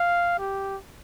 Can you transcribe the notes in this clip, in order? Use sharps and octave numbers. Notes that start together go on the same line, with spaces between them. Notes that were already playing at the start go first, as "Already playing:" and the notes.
Already playing: F5
G4